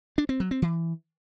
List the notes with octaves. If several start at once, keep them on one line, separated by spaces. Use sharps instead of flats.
D4
C4
F#3
C4
E3